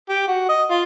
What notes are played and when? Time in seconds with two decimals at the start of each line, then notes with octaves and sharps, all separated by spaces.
0.09 G4
0.28 F#4
0.49 D#5
0.71 F4